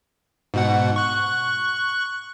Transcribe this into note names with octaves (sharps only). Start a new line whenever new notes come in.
G#2 B2 F#5
C#6 F#6